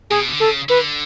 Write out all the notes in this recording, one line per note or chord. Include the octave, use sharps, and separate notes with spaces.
B2 G#4
D3
C#3 A4
D3 B4